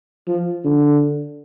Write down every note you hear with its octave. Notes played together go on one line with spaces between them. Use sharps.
F3
D3